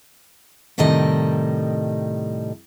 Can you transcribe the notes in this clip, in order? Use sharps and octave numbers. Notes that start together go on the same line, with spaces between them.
A2 C3 D#3 G3 A4 D#5